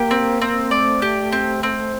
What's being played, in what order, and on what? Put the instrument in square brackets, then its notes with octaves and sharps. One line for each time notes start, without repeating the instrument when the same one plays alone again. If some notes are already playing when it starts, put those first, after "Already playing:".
Already playing: [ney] A#3 [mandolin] G4
[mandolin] C4
C4
[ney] A3 [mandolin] D5
[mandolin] G4
C4
C4